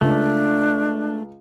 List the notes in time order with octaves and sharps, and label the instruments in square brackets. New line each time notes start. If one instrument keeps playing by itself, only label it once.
[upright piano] C#2 [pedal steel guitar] A3 [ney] D4